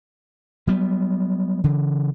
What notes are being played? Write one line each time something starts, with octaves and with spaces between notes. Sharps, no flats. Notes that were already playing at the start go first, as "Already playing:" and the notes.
F#3 G3 B3
C#3 E3